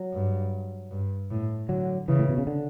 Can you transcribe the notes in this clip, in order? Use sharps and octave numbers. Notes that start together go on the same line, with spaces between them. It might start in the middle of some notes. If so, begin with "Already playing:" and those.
Already playing: F#3
G2
G2
A2
D3 F#3
C#3 E3
A2
B2
C#3
D3